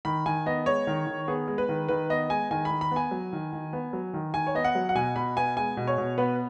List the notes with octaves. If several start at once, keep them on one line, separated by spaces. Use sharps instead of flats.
D#3 B5
D#3 G#5
B3 D#5
G#3 C#5
D#3
D#3
B3 G#4
G#3
B4
D#3
D#3 B4
B3 D#5
G#3 G#5
D#3 G#5
D#3 B5
B5
B3 G#5
F#3
D#3
D#3
B3
F#3
D#3
D#3 G#5
C#5
B3 D#5
F#5
F#3
F#5
B2 G#5
B2 B5
B3 G#5
G#3 G#5
B2
C#5
B2
B3 B4